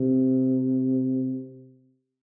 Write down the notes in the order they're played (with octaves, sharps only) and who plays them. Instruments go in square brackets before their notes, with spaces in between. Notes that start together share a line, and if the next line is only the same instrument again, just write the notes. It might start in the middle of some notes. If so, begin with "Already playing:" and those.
Already playing: [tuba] C3